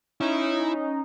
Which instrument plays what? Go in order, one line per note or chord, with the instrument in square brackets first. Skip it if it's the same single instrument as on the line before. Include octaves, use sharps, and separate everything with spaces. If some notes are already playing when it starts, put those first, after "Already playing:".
[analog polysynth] C#4 D#4 [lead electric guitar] E4